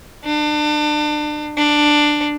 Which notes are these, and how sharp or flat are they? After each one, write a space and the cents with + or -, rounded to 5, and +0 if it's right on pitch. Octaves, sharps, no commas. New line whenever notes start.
D4 +30
D4 +10